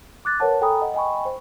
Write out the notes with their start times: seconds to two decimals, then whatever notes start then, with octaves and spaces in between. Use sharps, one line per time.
0.25 D6 F#6 A6
0.40 A#4 B4 C#5 F#5 A5
0.61 A4 G5 G#5 A#5 B5 D#6
0.82 D#5 F#5
0.94 D#5 G5 G#5 B5 C#6
1.25 C5